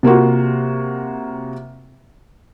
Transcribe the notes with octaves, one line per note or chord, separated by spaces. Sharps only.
C3 A#3 F4 F#4